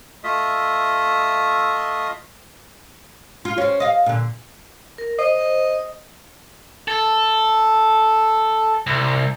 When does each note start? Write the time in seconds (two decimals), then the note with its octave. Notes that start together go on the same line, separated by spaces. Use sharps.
0.24 A3 F4 D#5 E5
3.45 F4
3.58 C4 C#4
3.80 D#5 F5
4.06 A#2 D3
4.98 A#4
5.19 C5 D#5
6.88 A4
8.87 C2